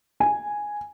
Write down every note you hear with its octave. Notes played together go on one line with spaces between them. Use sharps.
G#5